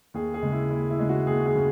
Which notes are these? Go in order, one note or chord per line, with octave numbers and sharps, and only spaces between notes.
D#2 G#4
G#4
C#3 G#3
E4
D#2 E4
E4
C#3 G#3
F#4
D#2 G#4
G#4
C#3